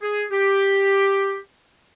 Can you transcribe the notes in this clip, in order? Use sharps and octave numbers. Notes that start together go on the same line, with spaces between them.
G#4
G4